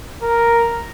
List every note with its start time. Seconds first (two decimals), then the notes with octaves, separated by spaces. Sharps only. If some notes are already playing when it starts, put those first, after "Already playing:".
0.22 A#4